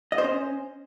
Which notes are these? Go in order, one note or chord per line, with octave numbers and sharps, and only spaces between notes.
D#5
C5
C#4